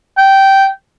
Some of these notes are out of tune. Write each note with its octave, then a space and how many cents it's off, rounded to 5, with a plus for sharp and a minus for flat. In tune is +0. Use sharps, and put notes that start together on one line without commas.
G5 -10